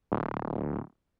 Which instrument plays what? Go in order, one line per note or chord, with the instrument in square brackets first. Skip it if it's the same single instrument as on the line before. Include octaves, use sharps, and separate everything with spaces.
[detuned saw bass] D1